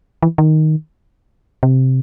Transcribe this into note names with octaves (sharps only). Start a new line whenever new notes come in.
E3
D#3
C3